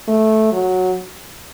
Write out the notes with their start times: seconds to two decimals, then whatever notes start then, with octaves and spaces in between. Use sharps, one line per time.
0.08 A3
0.52 F#3